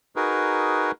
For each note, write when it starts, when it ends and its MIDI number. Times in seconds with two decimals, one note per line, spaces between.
0.16 0.92 63
0.16 0.92 66
0.16 0.92 68
0.16 0.92 70
0.16 0.92 71